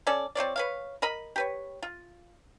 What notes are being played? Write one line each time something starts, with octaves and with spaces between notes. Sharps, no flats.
C#4 A4 D5
C4 F4 C#5 D5
B4 C#5 F5
A#4 D#5 B5
G4 B4 C#5
F4